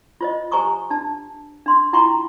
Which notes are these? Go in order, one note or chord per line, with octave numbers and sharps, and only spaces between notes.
F4 C5 D#5
G4 C5 G#5 A#5 C#6 D#6
D4 A5
D4 C6
E4 F4 G5 A#5 C6 C#6